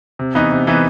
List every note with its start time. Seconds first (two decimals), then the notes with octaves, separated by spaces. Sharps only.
0.19 C3
0.35 E3 B3 D#4
0.51 C3
0.67 E3 B3 D#4